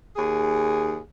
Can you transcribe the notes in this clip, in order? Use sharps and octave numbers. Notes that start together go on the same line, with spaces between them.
D#2 G#4